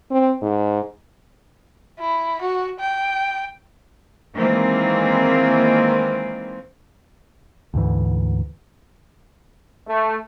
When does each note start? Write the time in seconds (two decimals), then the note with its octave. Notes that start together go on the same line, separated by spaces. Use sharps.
0.11 C4
0.42 G#2
1.99 E4
2.41 F#4
2.80 G5
4.35 D#3 E3 G#3 A#3 C4
7.74 D2 G#2 E3
9.88 A3